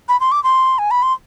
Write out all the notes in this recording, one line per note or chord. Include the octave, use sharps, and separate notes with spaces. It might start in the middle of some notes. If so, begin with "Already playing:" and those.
B5
C6
D6
C6
G#5
B5
C6